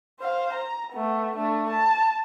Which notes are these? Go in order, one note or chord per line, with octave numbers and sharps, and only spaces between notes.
C5 F5
A#5
A3 B3
A3 D4
A5